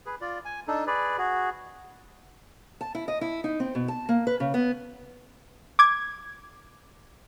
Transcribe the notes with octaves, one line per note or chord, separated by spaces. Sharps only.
G#4 B4
F4 D5
G#5
D4 D#4 A4
G#4 B4 D5
F#4 G#4
A5
E4
D#5
E4
D#4
C4
B2
A5
A#3
B4
C#3
B3
D6 G#6